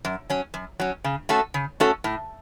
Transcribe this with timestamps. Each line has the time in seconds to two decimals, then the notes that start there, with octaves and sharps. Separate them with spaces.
0.05 F#2
0.30 F#3 C#4
0.54 F#2
0.80 F#3 C#4
1.04 C#3
1.29 A3 C#4 F#4 A4
1.54 C#3
1.80 A3 C#4 F#4 A4
2.04 A2